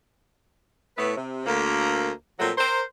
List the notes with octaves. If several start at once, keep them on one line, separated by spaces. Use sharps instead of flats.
A2 A3 B3 E4 B4
C3
D2 A#3
A#2 F3 F#3 A3 C4
A#4 C5